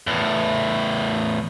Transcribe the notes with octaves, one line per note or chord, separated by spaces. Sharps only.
E2 A2